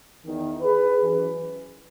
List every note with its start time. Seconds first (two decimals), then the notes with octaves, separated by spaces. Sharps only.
0.25 E2 D#3
0.62 G#4 B4
1.01 F#2 E3